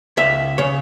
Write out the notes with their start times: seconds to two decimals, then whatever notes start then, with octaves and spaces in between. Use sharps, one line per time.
0.17 C#2 E5
0.58 C#3 C#5